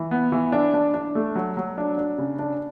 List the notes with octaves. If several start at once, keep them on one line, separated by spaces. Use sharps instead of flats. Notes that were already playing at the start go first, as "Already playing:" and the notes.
Already playing: E3
B3
E3
D4
D4
D4
A3
F#3
F#3
D4
D4
C#3
D4